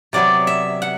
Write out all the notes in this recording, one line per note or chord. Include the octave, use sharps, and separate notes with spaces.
C3 F#3 B3 D5
E5
F#5